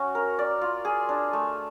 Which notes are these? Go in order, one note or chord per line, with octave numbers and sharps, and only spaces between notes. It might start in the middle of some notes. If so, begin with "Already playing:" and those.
Already playing: C#4 F#4
A#4
D5
F4
G#4
D4
A3